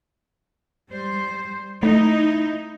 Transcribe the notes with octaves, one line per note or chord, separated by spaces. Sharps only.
G3 C5
A3 D#4 E4